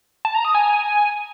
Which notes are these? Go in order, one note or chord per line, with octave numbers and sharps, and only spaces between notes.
A5
A#5
D#6
G#5